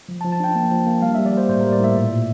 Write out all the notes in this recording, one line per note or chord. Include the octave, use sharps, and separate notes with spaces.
F3
A5
F3
A5
D4 G5
A#3
F3
A#3
G3 F5
E5
G3
D5
G3 C5
A2 C5
A#4
G3
D5
A2 E5
A#2
A#2